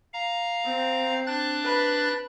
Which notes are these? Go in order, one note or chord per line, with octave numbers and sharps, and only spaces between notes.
F5 A#5
C4
D4 F#6 A6
B4